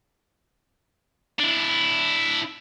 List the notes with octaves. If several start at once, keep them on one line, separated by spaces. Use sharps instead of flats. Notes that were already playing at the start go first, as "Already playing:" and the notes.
D4 E4